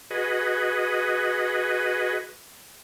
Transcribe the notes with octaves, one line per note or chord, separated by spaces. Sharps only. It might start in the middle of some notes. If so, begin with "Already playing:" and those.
F#4 G#4 B4 D#5